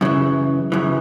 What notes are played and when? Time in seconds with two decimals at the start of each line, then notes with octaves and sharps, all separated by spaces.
0.01 F#2 C#3 E3
0.72 F#2 C#3 E3